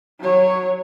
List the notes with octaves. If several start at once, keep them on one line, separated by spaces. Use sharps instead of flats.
F#3 C#5